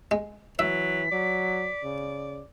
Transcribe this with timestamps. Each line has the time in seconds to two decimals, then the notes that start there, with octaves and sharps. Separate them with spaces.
0.11 G#3
0.59 E3 F#3 E5 B6
1.12 F#3 D5
1.84 C#3